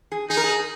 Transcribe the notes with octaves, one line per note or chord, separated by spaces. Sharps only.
G#4
D#4 G#4
A#4
G#4